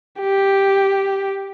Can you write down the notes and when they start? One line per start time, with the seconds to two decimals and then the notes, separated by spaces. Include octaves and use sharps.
0.20 G4